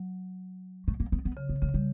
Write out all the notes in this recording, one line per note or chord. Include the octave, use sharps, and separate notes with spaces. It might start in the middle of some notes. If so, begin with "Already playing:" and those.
Already playing: F#3
A3
A#3
B3
B3
C#3
B3
C#3 A3
G3